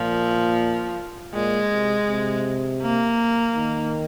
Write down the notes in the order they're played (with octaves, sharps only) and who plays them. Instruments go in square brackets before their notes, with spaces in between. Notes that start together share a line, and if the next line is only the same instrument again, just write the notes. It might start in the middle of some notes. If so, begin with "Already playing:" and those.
Already playing: [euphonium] A#2 [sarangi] F3
[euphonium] A#2 [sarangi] G#3
[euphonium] C3
C3
[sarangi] A#3
[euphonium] D#3